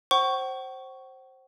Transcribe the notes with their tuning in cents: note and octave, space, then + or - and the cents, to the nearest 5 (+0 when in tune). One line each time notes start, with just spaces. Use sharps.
C5 +15 F#5 +45 C#6 +0